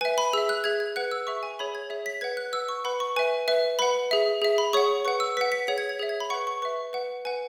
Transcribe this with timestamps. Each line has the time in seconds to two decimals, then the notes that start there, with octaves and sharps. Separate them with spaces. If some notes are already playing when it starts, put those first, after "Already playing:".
0.01 B4 E5 G#5
0.18 B5
0.33 G#4 E5 E6
0.49 F#6
0.64 G#4 E5 G#6
0.80 G#6
0.96 B4 F#5 F#6
1.11 E6
1.27 G#4 E5 C#6
1.43 G#5
1.59 G#4 C#5 E5 B5
1.75 G#6
1.90 G#4 C#5 E5
2.06 B6
2.21 B4 F#5 G#6
2.37 F#6
2.53 B4 F#5 E6
2.69 C#6
2.84 B4 F#5 B5
3.00 C#6
3.16 B4 E5 G#5
3.48 B4 E5
3.79 B4 F#5 B5
4.11 G#4 E5
4.42 G#4 E5
4.58 B5
4.73 G#4 C#5 F#5 C#6
5.05 B4 F#5 C#6
5.20 E6
5.37 B4 F#5 B6
5.52 B6
5.67 G#4 C#5 F#5 B6
5.78 G#6
5.89 G#6
5.99 G#4 C#5 E5
6.09 G#6
6.20 B5
6.30 B4 F#5 C#6
6.47 C#6
6.62 B4 E5 C#6
6.93 B4 F#5
7.25 B4 F#5 G#5